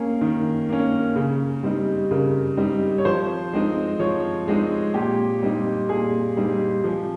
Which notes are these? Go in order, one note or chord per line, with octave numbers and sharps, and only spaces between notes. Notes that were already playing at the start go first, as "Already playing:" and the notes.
Already playing: A#3 C#4 G#4
D#3
A#3 C#4
C#3
G3 C4 D#4
C#3 A#4
G3 C4 D#4
C#5
F3 C5
G#3 C4 D#4
F3 C#5
G#3 C4 D#4
A#2 G4
G3 C4 D#4
A#2 G#4
G3 C4 D#4
F3